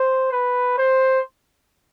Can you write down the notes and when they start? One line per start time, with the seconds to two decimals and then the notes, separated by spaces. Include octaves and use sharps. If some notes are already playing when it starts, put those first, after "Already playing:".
Already playing: C5
0.32 B4
0.78 C5